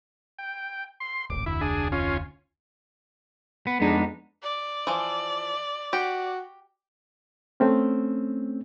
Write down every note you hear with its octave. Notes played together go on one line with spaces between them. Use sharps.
G5
C6
D1 G#1 D6
F1 D2 E4
D4 G#4
C#4 F4
B3
F2 G#3 B3 D4 D#4
D5
E3 F3
F#4 G4
A3 C4 C#4